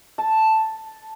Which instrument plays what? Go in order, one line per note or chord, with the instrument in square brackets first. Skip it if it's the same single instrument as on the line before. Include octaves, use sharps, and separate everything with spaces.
[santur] A5